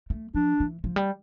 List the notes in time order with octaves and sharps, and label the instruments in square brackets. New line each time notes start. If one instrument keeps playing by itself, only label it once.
[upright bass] A3
[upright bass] F3 [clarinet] D4
[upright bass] E3
F3
G3